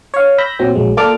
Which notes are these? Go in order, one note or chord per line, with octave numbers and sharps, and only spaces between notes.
C#5 F5
B5 E6 G6 A#6
A#2 F#3 C4
A#1 F#3 G#3
A#3 F4 A4 D5 D6 F6